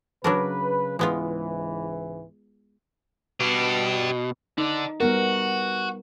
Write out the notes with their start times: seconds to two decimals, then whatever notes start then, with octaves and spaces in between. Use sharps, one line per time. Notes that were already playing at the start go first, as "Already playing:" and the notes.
0.24 C#3 F#3 D4 A#4 B4
0.99 C#2 G#2 E3 G#3 B3 F4
3.40 B2 D4 G4
4.58 D3 D4 D#4
5.00 G3 B3 F#4 A#4